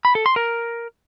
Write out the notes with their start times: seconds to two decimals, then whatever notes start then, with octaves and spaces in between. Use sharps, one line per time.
0.05 B5
0.15 A4
0.26 C6
0.36 A#4